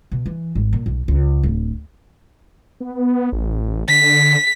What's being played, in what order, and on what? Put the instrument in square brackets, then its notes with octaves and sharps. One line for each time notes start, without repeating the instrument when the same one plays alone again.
[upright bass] B2
E3
G#1
A#2
B1
C#2
D1
[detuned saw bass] B3
A1
[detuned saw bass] D3 [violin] B6